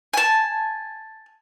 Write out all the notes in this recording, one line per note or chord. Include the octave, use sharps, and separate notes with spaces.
G#5 A5